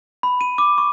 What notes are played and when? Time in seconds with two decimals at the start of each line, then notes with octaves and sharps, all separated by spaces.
0.23 B5
0.41 D#7
0.58 D6
0.78 C#6